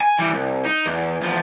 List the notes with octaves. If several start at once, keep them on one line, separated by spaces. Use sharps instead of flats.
G#5
E3 G3
C2
D#4
E2
E2 F3